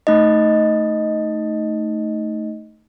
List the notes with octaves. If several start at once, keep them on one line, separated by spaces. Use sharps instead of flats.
A3 D#4 D#5